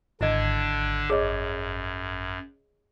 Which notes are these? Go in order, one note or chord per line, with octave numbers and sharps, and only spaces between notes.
G#1 D3 D4 E4 D#5 G#6
F#2 G#4 C#5 D#5